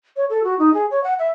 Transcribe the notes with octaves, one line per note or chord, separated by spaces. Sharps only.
C#5
A4
F#4
D#4
G#4
C#5
F#5
E5